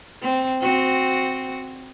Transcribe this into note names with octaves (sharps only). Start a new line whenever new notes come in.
C4
C4 F#4